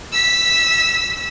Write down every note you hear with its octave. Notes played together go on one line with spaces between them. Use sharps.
E6 B6